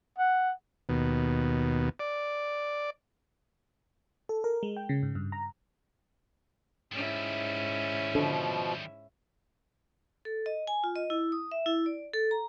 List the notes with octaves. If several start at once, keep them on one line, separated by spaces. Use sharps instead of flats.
F#5
D#2 B2
D5
A4
A#4
G#3
G5
C#3
G#2
G2
A#5
G#2 D#3 G3 C#4 E4
B2 D3 F3
A4
D#5
G#5
F4
D#5
E4
D#6
E5
E4
D5
A4
A#5